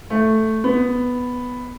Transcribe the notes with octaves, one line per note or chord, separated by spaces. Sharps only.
A3
B3